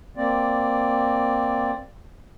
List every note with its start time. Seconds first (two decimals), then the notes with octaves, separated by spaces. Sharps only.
0.17 A#3 C4 D5